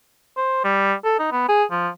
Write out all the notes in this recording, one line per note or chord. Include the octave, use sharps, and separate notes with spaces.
C5
G3
A4
D#4
B3
G#4
F3